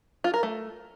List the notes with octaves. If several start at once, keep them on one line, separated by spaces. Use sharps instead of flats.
F4
A#4
A3